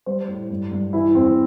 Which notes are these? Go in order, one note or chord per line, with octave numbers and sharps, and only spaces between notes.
G3 C5
A2
G2
G2
E3 E4
E2 C4